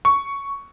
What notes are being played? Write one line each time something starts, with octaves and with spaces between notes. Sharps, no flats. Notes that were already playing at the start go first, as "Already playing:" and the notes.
C#6